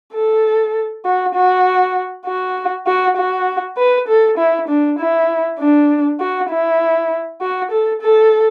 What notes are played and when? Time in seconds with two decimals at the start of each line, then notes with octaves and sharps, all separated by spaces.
0.14 A4
1.05 F#4
1.35 F#4
2.26 F#4
2.87 F#4
3.17 F#4
3.77 B4
4.08 A4
4.38 E4
4.68 D4
4.99 E4
5.59 D4
6.20 F#4
6.50 E4
7.41 F#4
7.71 A4
8.02 A4